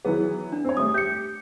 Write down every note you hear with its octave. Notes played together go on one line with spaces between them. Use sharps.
E3 F#3 B3 G#4
D4
C4 C#5
G3 A3 D#6
G4 G6 C#7